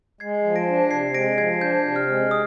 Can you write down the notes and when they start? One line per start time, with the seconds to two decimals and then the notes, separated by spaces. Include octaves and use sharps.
0.20 G#3 G#6 C7
0.44 F3
0.56 A#6 D7
0.68 D4
0.91 C3 G#6 C7
1.14 G#3 A#6 D7
1.38 F3 G#6 C7
1.61 D4 G6
1.85 C3
1.96 F6
2.08 G#3
2.31 D#6